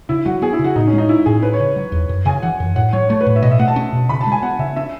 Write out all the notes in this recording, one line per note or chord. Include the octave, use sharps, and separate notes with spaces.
C#3 E4
F#3 F#4
B3 G#4
E4
C#3
F#4
A2 D#4
C#4
G#3
D#4
C#4 E4
A2 G#4
C#4 B4
C#5
C#3
F#3
E2
F#2
C#3 G#5
E3 F#5
F#2
A2 F#5
F#3 C#5
A3 C#5
B4
A2
E5
B2 D#5
E5
A3 F#5
A5
C#4
B2
C#3 B5
A5
G#3
G#5
B3 F#5
C#3 E5
C#4 E5